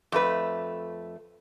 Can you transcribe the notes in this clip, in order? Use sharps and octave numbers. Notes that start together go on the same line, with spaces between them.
F2 A3 B4